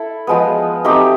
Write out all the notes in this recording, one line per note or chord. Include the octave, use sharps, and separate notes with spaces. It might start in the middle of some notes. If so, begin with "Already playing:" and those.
Already playing: E4 A4
F3 G#3 B3
A3 C4 D#4 G4